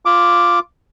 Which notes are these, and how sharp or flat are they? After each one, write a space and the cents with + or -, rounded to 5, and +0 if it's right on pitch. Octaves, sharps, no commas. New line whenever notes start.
F4 +0 D6 +0